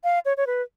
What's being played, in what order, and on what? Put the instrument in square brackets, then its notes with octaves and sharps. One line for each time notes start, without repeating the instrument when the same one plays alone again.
[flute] F5
C#5
C#5
B4